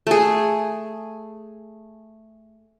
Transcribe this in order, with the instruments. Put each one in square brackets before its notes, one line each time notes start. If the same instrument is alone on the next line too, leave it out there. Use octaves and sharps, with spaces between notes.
[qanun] A3 G#4